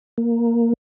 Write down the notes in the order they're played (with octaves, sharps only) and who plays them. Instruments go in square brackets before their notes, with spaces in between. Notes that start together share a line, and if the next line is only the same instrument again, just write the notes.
[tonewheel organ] A#3